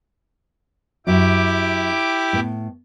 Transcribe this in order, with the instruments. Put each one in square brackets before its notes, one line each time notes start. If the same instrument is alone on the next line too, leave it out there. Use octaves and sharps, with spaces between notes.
[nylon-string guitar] F#2 F#4 [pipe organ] E4 G4 D6
[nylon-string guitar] A2 B3